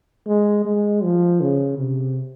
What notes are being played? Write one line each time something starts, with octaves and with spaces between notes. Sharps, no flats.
G#3
G#3
F3
C#3
C3